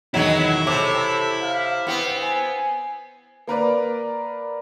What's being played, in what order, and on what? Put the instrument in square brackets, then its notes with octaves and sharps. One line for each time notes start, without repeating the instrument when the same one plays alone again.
[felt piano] E2 B2 D#3 [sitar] F#3 G#3 [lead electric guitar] E4 E5
[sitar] C3 [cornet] A4 [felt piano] C#5 D6
[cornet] F5
[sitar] B3 C4
[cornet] G#5
[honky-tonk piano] A#3 A#4 B4 D5